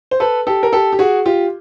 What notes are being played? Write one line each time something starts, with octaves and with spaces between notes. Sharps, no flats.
C5
A4 B4
G4 A4
A#4
G4 A4
G4
F#4 G#4
F4 G4